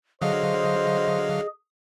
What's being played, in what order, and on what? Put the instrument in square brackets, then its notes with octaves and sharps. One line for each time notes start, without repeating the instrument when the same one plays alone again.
[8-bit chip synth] D3 F#3 F5 [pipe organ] G#4 [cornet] C5 [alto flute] D#5